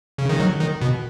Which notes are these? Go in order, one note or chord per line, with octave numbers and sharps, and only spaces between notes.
C#3
D#3
F#3
D#3
B2